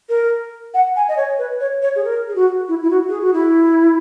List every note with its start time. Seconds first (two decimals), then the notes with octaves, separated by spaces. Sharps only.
0.09 A#4
0.74 F#5
0.96 G#5
1.09 D#5
1.17 C#5
1.39 B4
1.60 C#5
1.82 C#5
1.96 G#4
2.04 A#4
2.29 G#4
2.35 F#4
2.68 E4
2.83 E4
2.90 F#4
3.09 G#4
3.21 F#4
3.34 E4